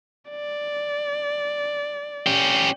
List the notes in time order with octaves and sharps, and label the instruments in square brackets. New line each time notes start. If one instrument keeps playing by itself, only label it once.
[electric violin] D5
[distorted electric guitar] C#4 G4